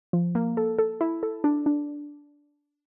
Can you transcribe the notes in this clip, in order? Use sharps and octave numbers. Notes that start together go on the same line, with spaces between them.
F3
A#3
A4
A4
E4
A4
D4
D4